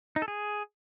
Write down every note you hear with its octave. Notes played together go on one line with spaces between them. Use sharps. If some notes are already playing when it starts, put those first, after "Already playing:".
D#4
A4
G#4